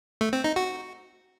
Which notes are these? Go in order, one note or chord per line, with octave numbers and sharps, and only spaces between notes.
A3
C4
D#4
F#4